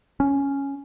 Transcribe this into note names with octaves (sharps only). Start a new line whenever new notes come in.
C#4